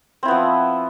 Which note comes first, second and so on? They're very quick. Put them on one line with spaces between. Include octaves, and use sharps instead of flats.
C4 E4 B3 F3